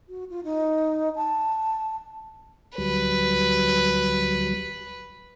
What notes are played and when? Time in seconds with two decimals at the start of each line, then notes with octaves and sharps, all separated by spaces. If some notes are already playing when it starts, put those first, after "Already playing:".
0.09 F#4
0.30 F4
0.44 D#4
1.16 A5
2.78 D2 F#3 G3 B4